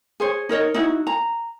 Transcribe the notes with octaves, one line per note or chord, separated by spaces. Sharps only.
G#4 C5 C#5
D#4 A#4 C#5 D#5
D#4 E4 F#4
A#5